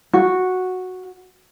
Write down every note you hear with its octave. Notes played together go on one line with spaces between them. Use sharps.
F#4